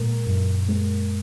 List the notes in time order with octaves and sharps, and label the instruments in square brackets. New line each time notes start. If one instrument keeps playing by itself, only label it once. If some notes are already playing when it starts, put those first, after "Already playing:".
Already playing: [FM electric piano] A#2 G#3 A#4
F#2
G#3